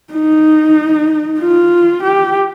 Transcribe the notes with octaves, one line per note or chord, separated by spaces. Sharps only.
D#4
F4
G4